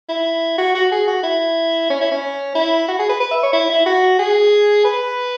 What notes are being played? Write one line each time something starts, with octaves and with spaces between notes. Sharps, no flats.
E4
F#4
F#4
G#4
F#4
E4
C#4
E4
C#4
E4
F#4
G#4
B4
B4
E5
C#5
E4
E4
F#4
G#4
B4